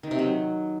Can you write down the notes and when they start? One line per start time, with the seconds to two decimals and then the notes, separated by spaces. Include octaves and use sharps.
0.03 D#3
0.11 C3
0.19 F#3